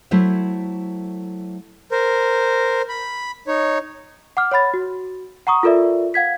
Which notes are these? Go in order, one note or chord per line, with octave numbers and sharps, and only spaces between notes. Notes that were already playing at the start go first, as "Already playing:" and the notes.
F#3 A3 E4 C5 C#5 E5
A#4 C5
B5
D#4 C#5
F#5 D6 F6
C#5 F#5 B5 A6
F#4
F#5 A#5 C#6 D#6
F4 A4 A#4 D5 E5
F5 F#5 G#6 B6